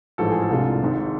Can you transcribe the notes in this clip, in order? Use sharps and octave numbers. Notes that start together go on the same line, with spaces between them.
A1 G#2 F3 G#3 A4
G#4
A4
C2 C3 G#3 D4 F4
G#1 G#2 G#3